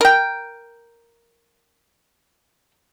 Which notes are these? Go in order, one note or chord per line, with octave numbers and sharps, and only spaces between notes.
A#4 G5